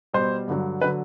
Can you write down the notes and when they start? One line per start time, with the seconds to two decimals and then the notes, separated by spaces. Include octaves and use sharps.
0.14 B2 G3 C5
0.48 G2 D3 F#3
0.81 D3 F#3 B4